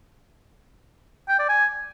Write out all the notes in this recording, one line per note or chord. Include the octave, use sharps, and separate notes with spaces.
G5
D5
G#5